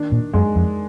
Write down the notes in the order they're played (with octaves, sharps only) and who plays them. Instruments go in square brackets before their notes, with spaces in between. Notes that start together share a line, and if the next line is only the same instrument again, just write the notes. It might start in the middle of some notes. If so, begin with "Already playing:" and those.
Already playing: [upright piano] D#3 D4
[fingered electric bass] A#2
[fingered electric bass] F#2 [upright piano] G#3
[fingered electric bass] F2